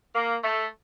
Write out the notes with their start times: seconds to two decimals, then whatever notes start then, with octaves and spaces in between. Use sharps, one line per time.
0.14 A#3
0.44 A3